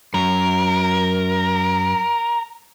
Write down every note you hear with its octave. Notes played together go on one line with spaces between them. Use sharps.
F#2 A#4